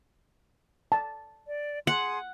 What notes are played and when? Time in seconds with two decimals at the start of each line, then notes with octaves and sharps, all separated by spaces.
0.92 A5
1.47 D5
1.87 G#4 F#5 C6 D#6